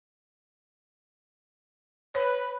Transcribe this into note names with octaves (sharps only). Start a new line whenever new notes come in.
B4 C#5